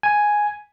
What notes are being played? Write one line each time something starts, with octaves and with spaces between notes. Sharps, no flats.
G#5